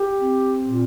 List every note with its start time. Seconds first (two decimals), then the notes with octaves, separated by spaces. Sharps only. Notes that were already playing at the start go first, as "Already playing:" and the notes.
Already playing: G4
0.19 C4
0.65 A#2